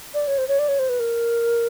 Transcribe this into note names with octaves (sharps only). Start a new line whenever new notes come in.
D5
C#5
C5
C#5
D5
C#5
C5
B4
A#4